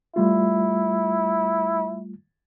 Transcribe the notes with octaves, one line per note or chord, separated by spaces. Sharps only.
G3 A3 E4 F4